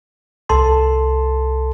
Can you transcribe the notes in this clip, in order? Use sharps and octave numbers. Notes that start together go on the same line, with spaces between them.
C2 A4 A5 C6